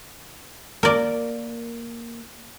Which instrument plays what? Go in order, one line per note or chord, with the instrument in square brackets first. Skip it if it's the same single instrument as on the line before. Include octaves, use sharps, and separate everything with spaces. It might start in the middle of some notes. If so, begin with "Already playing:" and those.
[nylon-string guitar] A#3 [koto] A#4 D5